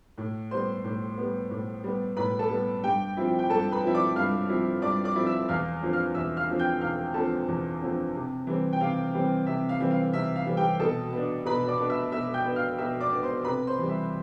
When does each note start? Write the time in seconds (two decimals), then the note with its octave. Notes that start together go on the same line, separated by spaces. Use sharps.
0.18 A2
0.51 G3 B3 C5 C6
0.84 A2
1.17 G3 B3
1.50 A2
1.84 G3 B3
2.17 A2 B4 B5
2.39 A4 A5
2.50 G3 B3
2.84 G2 G4 G5
3.17 F3 C4 E4
3.39 G5
3.50 G2 A4 A5
3.71 B4 B5
3.84 F3 C4 E4
3.94 D5 D6
4.16 G2 F5 F6
4.49 F3 C4 E4
4.82 G2 D5 D6
5.04 D5 D6
5.16 F3 C4 E4
5.26 E5 E6
5.49 E2 F5 F6
5.83 D3 F3 C4
5.93 F5 F6
6.15 E2 E5 E6
6.37 F5 F6
6.49 D3 F3 C4
6.59 G5 G6
6.81 E2 F5 F6
7.14 D3 F3 C4 A4 A5
7.48 E2
7.82 D3 F3 C4
8.15 C3
8.47 E3 G3 C4
8.73 G5
8.80 C3 F5
9.14 E3 G3 C4
9.46 C3 E5
9.69 F5
9.80 E3 G3 C4
9.91 F5
10.13 C3 E5
10.36 F5
10.47 E3 G3 C4
10.57 G4 G5
10.80 B2 A4 A5
11.13 B3 D4
11.46 B2 B4 B5
11.67 D5 D6
11.79 B3 D4
11.89 E5 E6
12.12 B2 E5 E6
12.34 G5 G6
12.46 B3 D4
12.56 F5 F6
12.78 B2 E5 E6
13.01 D5 D6
13.12 B3 D4
13.23 C5 C6
13.45 C3 B4 B5
13.67 C5 C6
13.78 E3 G3
13.89 E5